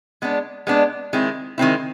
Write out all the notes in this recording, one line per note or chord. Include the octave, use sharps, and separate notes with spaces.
G#3 B3 D4
G#3 B3 D4
D#3 G#3 C4 E4
D#3 G#3 C4 E4